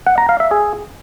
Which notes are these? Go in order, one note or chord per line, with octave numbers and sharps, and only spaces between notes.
F#5
A#5
F5
E5
G#4